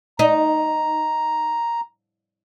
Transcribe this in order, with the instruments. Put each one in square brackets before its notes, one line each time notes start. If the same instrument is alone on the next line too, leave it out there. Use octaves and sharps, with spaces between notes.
[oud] D#4 [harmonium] A#5